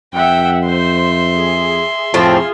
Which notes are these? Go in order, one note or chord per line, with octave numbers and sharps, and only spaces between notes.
F2 E5 F#5 G5
C5 E5 C6
G#4
F2 A2 F3 C4 F4 G#4